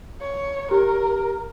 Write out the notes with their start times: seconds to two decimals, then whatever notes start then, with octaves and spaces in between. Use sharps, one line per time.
0.21 C#5
0.71 G4 A#4